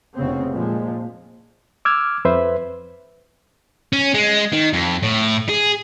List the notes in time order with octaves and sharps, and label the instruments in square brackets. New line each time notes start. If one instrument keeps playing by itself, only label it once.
[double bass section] F1 C#3 B3 C4
A#2 F3 G#3
[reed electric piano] D6 E6 F6 G#6
F2 B4 C5 E5
[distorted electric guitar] C#4
G#3
D#3
F2
A2
G#4